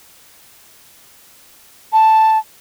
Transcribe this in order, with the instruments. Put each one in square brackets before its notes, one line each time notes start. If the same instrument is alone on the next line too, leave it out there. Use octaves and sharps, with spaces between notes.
[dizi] A5